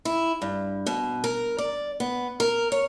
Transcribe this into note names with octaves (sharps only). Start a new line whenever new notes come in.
E4
G2
B2
A#4
D5
B3
A#4
C#5